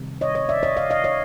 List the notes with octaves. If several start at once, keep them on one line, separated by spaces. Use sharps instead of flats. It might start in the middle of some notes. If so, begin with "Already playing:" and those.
Already playing: C3 D#3 G3
C#5 D#5
C#5 D#5
D5 E5
C#5 D#5
D#5 F5
D#5 F5
C#5 D#5